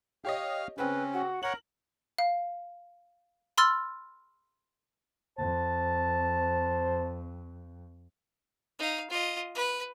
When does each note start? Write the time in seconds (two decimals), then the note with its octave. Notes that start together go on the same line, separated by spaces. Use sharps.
0.25 G4 C#5 D#5 F5 F6
0.78 C#3 C4 C#4 B4
1.13 F#4
1.43 A#4 C#5 F#5 F#7
2.18 F5
3.58 B5 C6 E6 F6 A6
5.38 F2 C5 A5
8.79 D#4 F5
9.10 F4 D#5
9.55 B4